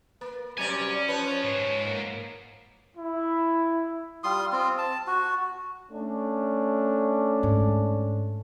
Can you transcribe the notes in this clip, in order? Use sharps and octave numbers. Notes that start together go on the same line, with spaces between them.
A#3 B4
C3 F#3 G3 C#4 D5 G#5
F3 B4 C#5
G#2
A#3
E4
G3 F4 C6 D#6
C4 F4
A5
F#4
A3 C#4 D4
G#2